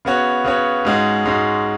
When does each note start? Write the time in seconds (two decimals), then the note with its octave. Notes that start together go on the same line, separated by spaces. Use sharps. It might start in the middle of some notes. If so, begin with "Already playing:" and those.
0.05 C#3 B3 F#4 C#5
0.44 C#3 B3 F#4 C#5
0.85 G#2 G#3 C#4 F#4
1.25 G#2 G#3 C#4 F#4